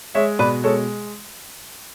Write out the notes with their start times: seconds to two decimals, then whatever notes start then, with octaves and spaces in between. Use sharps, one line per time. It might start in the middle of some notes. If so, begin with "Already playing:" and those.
0.15 G#3 C#5 E5
0.39 B2 B4 D5
0.63 G#3 A4 C#5